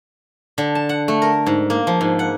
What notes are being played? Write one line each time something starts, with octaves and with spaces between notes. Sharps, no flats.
D3
A5
F#5
A3
A#4
G#2
A#3
F3
G#2
F#5